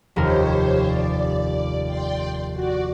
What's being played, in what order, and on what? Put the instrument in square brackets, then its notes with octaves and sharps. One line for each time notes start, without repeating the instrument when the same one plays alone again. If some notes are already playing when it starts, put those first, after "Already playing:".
[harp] F1 D#2 A#4 [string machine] G4 C5 C#5
[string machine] D5
D5 G5 C6
F#4 D5